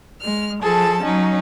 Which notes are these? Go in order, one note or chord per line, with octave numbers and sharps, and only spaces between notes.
G#3 F6
F3 G#4 A4 A5
F#3 C#4 D#4